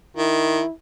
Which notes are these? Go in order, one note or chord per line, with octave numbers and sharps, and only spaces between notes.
D#3 E4